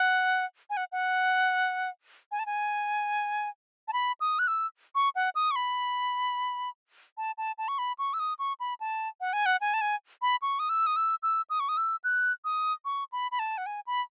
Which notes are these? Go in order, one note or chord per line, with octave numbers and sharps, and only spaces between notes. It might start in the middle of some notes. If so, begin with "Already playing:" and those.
Already playing: F#5
G#5
F#5
F#5
G#5
A5
G#5
A5
B5
D#6
F#6
E6
C#6
F#5
D#6
C#6
B5
A5
A5
A5
C#6
B5
C#6
E6
D#6
C#6
B5
A5
F#5
G#5
F#5
G#5
A5
G#5
B5
C#6
D#6
E6
D#6
E6
E6
D#6
C#6
D#6
E6
F#6
D#6
C#6
B5
B5
A5
F#5
G#5
B5